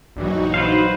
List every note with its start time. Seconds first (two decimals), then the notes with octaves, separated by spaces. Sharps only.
0.16 A#1 G2 E3 F#3 D#4 F#4
0.54 B4 C5 F5